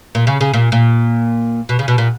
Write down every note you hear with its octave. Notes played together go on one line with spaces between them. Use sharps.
A#2
C#3
C#3
A#2
A#2
B2
C#3
B2
A#2